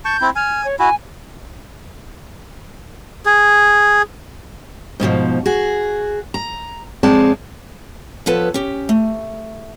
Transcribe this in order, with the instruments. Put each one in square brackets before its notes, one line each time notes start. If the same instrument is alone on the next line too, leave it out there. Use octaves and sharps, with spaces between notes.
[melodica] A5 C#6 [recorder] G6
[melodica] C4 E4
[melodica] G#5 [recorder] F6
[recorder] C#5
[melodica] E4 F#4 [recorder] G#5
[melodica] G#4
[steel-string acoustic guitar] G#2 B2 D3 F3
F#4 G#4
A#5
F2 G#3 C4 D5 A5
F3 B3 A4 B4 C#5 A5
C#4 G4
A3